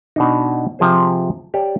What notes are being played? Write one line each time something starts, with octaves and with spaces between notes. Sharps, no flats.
B2 D4 D#4
C3 F3 G#4 C5
G4 C#5 D5 A5